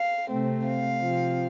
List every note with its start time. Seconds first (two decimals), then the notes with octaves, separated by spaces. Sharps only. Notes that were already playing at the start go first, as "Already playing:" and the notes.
Already playing: F5
0.29 C3 A3 C4
0.66 F5
1.01 C3 F3 C4